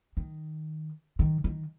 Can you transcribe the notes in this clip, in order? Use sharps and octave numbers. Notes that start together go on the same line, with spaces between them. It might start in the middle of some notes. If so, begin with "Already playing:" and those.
D#3
D#3
D#3